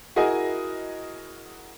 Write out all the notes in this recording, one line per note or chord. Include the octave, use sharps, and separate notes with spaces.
E4 F#4 G#4 A#4 D#5 G#5